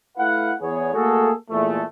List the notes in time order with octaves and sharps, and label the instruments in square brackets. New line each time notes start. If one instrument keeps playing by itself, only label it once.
[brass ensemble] A3 E4 B4 F5 F#5
E2 B3 G#4 C#5
A3 A#3 F#4 G#4 A4
E2 A#2 E3 G#3 A3